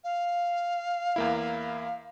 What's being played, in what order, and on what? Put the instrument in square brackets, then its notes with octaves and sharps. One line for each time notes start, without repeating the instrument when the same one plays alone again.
[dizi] F5
[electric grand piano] E2 A#3 E4